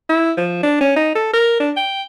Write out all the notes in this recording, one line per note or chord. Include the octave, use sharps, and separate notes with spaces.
E4
F3
D4
C#4
D#4
A4
A#4
D4
G5